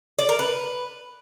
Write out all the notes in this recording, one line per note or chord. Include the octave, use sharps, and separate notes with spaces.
D5
A#4
B4